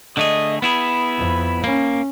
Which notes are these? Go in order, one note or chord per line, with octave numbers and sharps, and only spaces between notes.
D3 A3 G#4 D#5
B3 E4 G#4 B5
F2
A#3 C#4